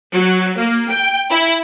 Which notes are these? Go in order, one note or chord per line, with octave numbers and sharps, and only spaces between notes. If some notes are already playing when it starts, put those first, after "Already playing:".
F#3
A#3
G5
E4